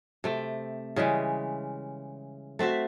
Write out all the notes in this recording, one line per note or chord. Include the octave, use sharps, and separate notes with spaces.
C3 A3 G5
C#3 E3 G3 G#3
A3 C4 F#4 E5